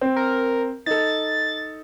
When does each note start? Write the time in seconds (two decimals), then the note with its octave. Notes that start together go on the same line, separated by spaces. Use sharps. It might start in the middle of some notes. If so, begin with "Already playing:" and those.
0.01 C4
0.16 A#4
0.86 D#4 A4 A6